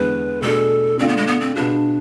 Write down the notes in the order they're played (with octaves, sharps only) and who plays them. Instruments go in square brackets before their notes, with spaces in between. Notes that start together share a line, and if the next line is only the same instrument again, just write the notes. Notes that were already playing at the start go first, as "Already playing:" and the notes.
Already playing: [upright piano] E2 D3 G#3 B3 [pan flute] B4
[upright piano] B2 A3 D4 G#4 [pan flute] A4
[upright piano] D3 A3 D4 F4 [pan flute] C4
[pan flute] B3
G#3
B3
C4
[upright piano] B2 B3 F4 G#4 [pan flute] D4